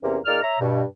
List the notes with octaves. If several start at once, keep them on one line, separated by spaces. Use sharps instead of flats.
E2 C3 A#3 C#4
A#2 A#3 D#4 G#4 D5 F6
C#5 E5 A#5
G2 B2